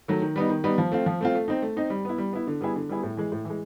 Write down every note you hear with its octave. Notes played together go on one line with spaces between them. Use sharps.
D#3 F#3 A3
D#3
G3 B3 D#4
D#3
G3 B3 D#4
F3
A3 C4 F4
F3
A3 C4 F4
A3
C4 D#4
A3
C4 D#4
G3
B3 E4
G3
B3 E4
D3
G3 B3 E4 G#4
D3
G3 B3 E4 G#4
A2
E3 G#3
A2
E3 G#3